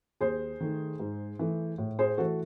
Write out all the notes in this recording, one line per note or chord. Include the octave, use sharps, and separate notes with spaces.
D#2 G#4 C5
D#3 A3
G#2
E3 A3
A2
G#4 C5
E3 A3 F#4 A4